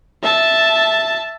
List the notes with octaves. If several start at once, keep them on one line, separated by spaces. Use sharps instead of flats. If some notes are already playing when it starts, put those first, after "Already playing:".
E5 A5